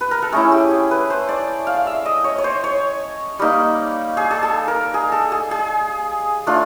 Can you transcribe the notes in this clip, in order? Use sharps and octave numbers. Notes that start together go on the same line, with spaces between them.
B4
A#4
A4
A3 C#4 E4 G#4
G4
G#4
B4
C5
D5
F5
E5
D#5
C#5
C#5
C5
C#5
G3 A#3 D#4
G#4
G#4
A4
A#4
G#4
A4
G#4
G#4
A3 D4 F4